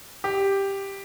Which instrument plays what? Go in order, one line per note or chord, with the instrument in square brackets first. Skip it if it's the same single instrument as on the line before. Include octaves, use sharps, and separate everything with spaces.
[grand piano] G4